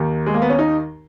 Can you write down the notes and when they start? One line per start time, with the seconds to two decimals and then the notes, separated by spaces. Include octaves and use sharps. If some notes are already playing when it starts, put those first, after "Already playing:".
Already playing: D#2 D#3
0.26 G#3
0.34 A#3
0.42 B3
0.50 C#4
0.59 D#4